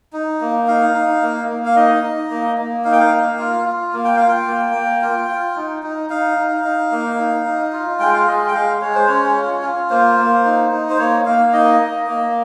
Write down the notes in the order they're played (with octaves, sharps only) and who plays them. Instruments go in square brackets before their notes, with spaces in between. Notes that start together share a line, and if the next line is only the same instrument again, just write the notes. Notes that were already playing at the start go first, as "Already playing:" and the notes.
[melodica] D#4
A#3
D#4 F5
D#4
A#3
A#3
F5
D#4 D#5
D#4
A#3
A#3
D#4 F5
G5
F5
A#3
F4
F4
A#3
G5
F4 F5
G5
A#3
A#3
F4
F4
D#4
D#4
D#4 F5
D#4
D#4
A#3
D#4
D#4
F4
G#3 G5
F5
G#3 D#5
G5
G#3 F5
G#3 C#5
C5
C#4 C#5
F4
F4
A#3 C5
A#3
D#4
D#4
C5
A#3 C#5
A#3 F5
D#4 D#5
A#3
A#3